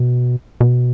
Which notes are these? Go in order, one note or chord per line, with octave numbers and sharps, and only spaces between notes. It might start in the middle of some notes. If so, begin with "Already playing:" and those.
Already playing: B2
B2